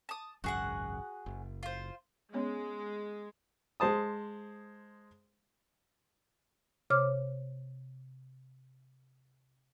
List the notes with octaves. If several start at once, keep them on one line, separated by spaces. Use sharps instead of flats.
A5 D#6
G#1 C#2 F#2 F#4 G#4 F#5
F#1
F4 C5
G#3 B3 C#4 C#5
G#3 C5 A5 D#6
C3 C5 C#5 D6 F6